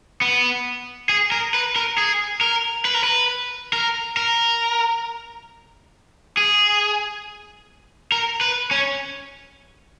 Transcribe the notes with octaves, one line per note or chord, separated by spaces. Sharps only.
B3
G#4
A#4
B4
A#4
G#4
A#4
B4
A#4
B4
A#4
A#4
G#4
A#4
B4
C#4